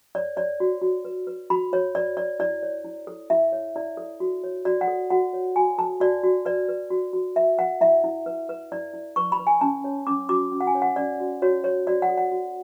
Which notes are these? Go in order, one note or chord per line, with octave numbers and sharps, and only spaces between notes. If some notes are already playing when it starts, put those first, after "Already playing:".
C#5 D5
C#5 D5
F#4
F#4
B4
B4
F#4 B5
F#4 C#5
B4 D5
B4 D5
E4 D5
C#5
E4
A4
E4 E5
C#5
E4 D5
A4
F#4
C#5
F#4 D5
F#5
A4
F#4 F#5
C#5
F#4 G#5
A4 A5
F#4 D5
F#4
B4 D5
B4
F#4
F#4
B4 E5
B4 F#5
E4 E5
E4
B4
B4
E4 D5
E4
B4 C#6
B5
B4
G#5
C#4 A5
C#5
C#4 D6
F#4 D6
C#4
F#5
G#5
C#5
F#5
C#4 D5
F#4
F#4 C#5
C#5
F#4 D5
F#5
A4
F#5
F#4